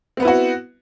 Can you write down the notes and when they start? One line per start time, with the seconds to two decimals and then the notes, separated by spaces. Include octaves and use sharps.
0.17 C4
0.20 B3
0.22 B4
0.25 E4
0.28 F#4